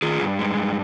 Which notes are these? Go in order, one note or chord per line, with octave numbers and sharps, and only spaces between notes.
D#3 F4 G#4
G2
G#3
G2